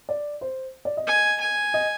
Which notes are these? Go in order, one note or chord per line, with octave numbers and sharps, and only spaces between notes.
D5
C5
D5
D#5
G#5
G#5
D#5